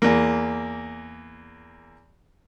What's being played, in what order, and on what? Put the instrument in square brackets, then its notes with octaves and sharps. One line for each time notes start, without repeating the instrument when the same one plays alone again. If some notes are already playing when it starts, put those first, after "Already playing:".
[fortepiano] E2 A#3